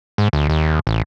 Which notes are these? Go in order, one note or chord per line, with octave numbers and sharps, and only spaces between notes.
G#2
D2
D#2
A1